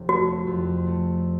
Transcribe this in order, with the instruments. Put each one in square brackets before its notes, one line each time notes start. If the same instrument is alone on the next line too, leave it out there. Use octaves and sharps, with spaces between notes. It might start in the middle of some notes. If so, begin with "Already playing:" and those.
Already playing: [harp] F1
[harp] A3 [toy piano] F#4
[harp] F2
A3